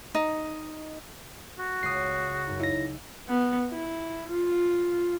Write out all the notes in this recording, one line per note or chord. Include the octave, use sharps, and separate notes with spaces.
D#4
F#4
C#2 D#6 C7
F#2 D#4
E4 D#5 F5 E6 A#6
B3
E4
F4